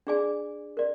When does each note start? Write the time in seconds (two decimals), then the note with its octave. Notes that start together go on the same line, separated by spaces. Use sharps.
0.07 D4 G#4 D5 G#5
0.77 A#4 D5